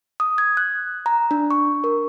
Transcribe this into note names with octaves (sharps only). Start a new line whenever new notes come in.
D#6
G#6
F#6
A#5
D4
C#6
A#4